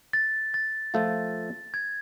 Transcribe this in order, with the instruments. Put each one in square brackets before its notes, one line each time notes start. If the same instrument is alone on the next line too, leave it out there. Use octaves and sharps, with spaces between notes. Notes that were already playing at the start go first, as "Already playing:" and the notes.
[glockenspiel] A6
A6
[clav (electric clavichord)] F3 A3 F4
[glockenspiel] G#6